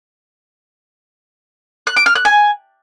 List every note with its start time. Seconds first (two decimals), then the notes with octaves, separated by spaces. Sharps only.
1.87 F#6
1.96 D6
2.06 F6
2.15 F#6
2.25 G#5